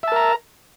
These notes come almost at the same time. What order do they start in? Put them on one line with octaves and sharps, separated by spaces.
E5 A5 A#4 A#5